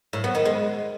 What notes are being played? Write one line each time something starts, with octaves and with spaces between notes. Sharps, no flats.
A2
B3
D#3
G#3